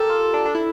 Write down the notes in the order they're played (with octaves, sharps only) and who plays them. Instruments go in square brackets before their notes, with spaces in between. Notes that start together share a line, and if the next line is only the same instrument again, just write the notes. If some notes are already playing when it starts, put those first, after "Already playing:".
Already playing: [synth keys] G4 A#4 [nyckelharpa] A4
[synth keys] F4
D4
D4
E4